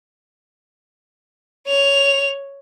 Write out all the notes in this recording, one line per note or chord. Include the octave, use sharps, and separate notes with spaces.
C#5 F7